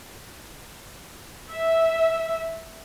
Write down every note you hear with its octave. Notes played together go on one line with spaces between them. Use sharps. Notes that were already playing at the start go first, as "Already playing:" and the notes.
E5